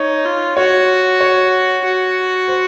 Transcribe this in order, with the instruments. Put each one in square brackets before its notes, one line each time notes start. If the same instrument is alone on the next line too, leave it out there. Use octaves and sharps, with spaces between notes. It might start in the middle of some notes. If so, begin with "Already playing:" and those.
Already playing: [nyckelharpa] D#4 [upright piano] C#5
[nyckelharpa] F4
[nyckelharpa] F#4 [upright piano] C#5
[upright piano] C#5
[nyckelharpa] F#4
[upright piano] C5